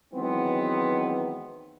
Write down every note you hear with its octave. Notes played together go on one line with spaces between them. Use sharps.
D#3 E3 F#3 G#3 B3 C4